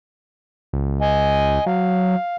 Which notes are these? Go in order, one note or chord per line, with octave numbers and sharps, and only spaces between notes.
C#2
D#5 G#5
F#3 F5